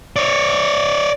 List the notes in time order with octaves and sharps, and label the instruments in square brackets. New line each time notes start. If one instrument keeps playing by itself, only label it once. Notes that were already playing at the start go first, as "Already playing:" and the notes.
[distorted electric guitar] C#5 D5